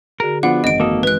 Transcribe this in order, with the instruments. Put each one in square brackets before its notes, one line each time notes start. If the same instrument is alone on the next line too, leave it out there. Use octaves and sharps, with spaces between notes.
[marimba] D3 F#4 G#4 [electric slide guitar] A#4
[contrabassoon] F3 [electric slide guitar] B3 D4 [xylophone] F#5
[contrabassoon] G#1 [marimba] F#2 E3 [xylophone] D#5 D7
[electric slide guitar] A#3 A4 [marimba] F#4 D#6
[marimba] E3 G#3 C4 [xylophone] B4 F#6